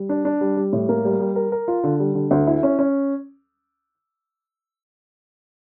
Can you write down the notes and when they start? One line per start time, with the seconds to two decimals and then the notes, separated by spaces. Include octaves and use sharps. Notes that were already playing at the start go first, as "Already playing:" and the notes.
Already playing: G3
0.09 D4
0.25 D4
0.41 G3
0.57 G3
0.73 A2
0.89 A#3
1.05 G3
1.20 G3
1.36 A#4
1.52 A#4
1.68 F4
1.84 D3
2.00 G3
2.15 D3
2.31 D2
2.47 E4
2.63 C#4
2.79 C#4